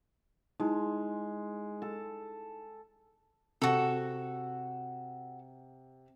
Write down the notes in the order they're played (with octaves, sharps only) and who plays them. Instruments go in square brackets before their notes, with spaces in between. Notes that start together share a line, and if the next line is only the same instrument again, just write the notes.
[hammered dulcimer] G#3 [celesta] D#4 E4
[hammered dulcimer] A4
[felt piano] C3 [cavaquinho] F#4 A4